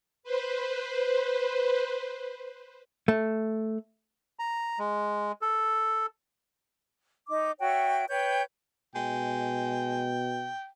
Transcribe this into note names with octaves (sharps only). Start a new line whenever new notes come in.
B4 C5
A3
A#5
G#3
A4
D#4 D#5 D6
F#4 C#5 E5 G5
B4 C#5 G5 G6
B2 G#3 G5